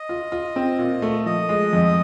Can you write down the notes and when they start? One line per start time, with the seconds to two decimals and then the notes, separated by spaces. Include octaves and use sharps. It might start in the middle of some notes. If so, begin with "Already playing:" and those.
Already playing: D#5
0.09 F4
0.32 F4
0.56 C4
0.79 A#2
1.02 A3
1.26 F3 D#5
1.49 G#3
1.73 F2